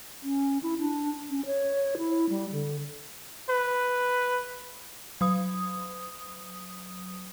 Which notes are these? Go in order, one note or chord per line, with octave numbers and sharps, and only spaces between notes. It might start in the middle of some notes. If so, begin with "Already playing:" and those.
C#4
E4
D4
C#4
C#5
E4
G3
D3
B4
F#3 D#6